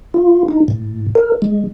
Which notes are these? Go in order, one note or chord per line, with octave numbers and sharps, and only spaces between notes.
F4
D#4
A2
A#4
G#3